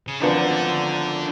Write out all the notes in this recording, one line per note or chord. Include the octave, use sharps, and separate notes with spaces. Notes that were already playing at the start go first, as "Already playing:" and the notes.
C#3
G#1 F#2 D3 F3 B3 D4